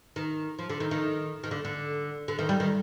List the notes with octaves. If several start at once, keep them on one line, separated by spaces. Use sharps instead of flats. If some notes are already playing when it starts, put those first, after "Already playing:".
D#3
F3
D3
D#3
D#3
D#3
D3
D3
D3
D#3
G3
D#3